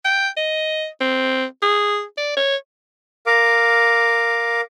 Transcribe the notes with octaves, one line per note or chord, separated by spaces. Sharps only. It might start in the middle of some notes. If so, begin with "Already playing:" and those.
G5
D#5
C4
G#4
D5
C#5
A#4 F5 D6